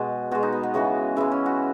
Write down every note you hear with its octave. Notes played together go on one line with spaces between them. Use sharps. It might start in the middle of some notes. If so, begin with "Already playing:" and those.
Already playing: B2 G#3 F#4
B2 G#3 F#4
D#4
B3
B3
C#3 E3 G#3 F#4
C#3 E3 G#3 E4
C#4
F#4